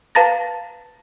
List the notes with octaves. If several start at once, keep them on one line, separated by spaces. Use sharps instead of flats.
B4 F5 A5 A#5 A6 A#6